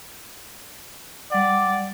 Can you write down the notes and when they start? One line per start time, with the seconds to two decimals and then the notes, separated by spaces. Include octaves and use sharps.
1.32 G3 D5 F#5